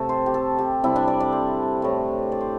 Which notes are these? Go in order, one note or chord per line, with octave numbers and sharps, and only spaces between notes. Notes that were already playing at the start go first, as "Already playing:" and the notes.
Already playing: C3 A3 A4
C5
G4
A4
G4
C3 G3 E4
D4
D5
D5
C5
A2 A3
D5
C5